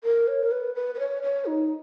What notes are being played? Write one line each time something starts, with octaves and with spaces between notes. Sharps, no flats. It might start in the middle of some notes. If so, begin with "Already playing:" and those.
A#4
C#5
A#4
B4
B4
B4
C#5
C#5
D#4